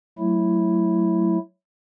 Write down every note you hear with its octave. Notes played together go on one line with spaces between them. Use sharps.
F#3 A3 E4